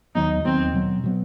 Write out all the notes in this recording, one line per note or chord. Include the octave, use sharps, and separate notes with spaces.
D#2 D#3 F#3 B3 D#4
D#2 D#3 F#3 B3 C4
B2 F#3 B3
B2 F#3 B3